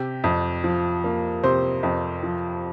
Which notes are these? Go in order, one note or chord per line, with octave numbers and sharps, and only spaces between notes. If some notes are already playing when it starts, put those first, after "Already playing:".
Already playing: C3 G4
F2
F3
A#3
C3 C5
F2
F3